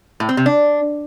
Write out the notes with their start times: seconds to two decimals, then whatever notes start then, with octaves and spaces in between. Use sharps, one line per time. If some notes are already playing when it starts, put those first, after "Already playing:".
0.20 A2
0.29 C4
0.37 C3
0.46 D4